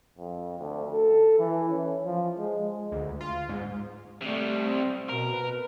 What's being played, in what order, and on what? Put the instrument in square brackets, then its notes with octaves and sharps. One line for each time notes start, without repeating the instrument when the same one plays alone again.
[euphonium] F2
D2
A4
E3
C#4
F3
G#3
[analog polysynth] D2
F4
G#2
[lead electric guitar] C3 G3 [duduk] A3
[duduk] C4
[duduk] B2 [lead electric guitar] A#4
[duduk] B4